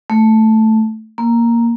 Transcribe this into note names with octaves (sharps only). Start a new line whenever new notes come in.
A3
A#3